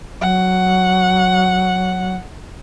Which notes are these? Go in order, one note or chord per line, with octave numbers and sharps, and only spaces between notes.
F#3 F#5